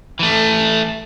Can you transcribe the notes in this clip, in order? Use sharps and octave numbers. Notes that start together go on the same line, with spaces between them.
E3 A3